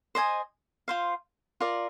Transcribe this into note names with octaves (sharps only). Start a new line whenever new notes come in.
C5 D#5 G#5 D#6
F4 C5 F5
F4 A#4 D5